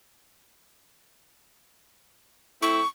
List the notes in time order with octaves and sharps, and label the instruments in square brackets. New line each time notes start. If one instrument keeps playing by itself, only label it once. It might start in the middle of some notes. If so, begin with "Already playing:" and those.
[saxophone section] A3 C4 E4 [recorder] C#6